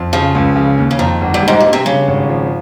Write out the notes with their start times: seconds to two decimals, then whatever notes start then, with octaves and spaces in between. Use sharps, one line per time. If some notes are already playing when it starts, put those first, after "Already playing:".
Already playing: F2
0.13 C#3 F3
0.35 C#2
0.56 C#3
0.78 D#2
0.91 C#3
0.99 F2 D#3
1.21 G1
1.34 G2
1.42 G3
1.48 G#2
1.60 G2 A#2
1.73 C3
1.86 G2 C#3
2.08 G#1
2.29 F3